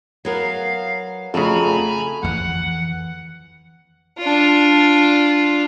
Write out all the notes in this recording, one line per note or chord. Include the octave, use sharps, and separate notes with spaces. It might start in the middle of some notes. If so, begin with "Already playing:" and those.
F#3 B3 A#4 F5
F2 C#3 A3 F#4 A4 G#5 A#5 B5
F2 E3 F#5
D4 F4